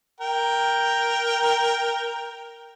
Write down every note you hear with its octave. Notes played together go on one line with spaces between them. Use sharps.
A#4 G5